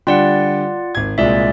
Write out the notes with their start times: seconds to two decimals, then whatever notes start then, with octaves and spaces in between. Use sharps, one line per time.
0.07 D3 G3 F4 D5 F#5 G5
0.95 G#1 G#6
1.18 C2 A#2 G#3 D5 E5